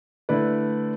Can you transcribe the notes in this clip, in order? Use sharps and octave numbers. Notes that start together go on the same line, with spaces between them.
D3 A3 E4 B4 D5